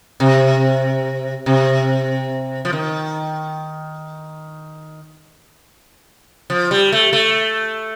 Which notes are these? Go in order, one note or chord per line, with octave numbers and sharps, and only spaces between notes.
C3
C3
F3
D#3
F3
G3
A3
A3